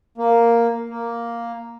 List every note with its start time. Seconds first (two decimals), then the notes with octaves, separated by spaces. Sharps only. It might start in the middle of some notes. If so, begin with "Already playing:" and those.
0.18 A#3
0.89 A#3